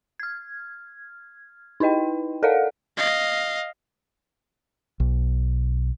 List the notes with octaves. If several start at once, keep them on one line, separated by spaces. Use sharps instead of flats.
F6 G#6
D#4 E4 B4 D#5 G5
A4 A#4 D5 D#5 F5 F#5
D#5 F5
B1